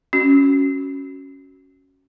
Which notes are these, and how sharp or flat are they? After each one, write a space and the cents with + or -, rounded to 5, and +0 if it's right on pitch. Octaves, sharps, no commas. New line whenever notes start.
C#4 +0 F#4 +5